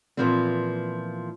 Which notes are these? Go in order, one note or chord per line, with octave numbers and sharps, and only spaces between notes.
A#2 E3 F3 B3 C4